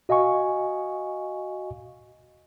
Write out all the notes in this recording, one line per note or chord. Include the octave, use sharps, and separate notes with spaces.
F#4 D#5 F5 G#5 C#6